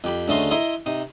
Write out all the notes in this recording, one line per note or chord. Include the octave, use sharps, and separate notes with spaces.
F2 G4 B5
D2 C#3 A3 D#5 C6
E4 D#5 A#5 C6
C3 D#4